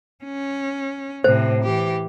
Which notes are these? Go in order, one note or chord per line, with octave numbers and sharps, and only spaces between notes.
C#4
A2 C3 C5
E3 G4